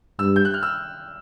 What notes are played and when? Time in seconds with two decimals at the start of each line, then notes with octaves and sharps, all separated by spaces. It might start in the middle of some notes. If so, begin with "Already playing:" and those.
0.19 G2 E6
0.36 G6
0.45 F#6
0.54 F6
0.63 E6